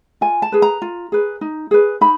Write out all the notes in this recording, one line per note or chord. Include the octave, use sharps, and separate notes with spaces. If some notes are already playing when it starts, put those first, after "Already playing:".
F4 G#5
A5
G#4 B4
A#5
F4
G#4 B4
D#4
G#4 B4
D#4 B5